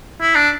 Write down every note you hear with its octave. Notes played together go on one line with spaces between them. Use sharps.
E4
D4